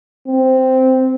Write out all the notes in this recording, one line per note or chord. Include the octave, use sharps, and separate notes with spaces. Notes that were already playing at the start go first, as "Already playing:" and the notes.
C4